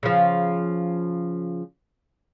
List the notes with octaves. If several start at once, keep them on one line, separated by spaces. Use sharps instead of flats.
C#3 F3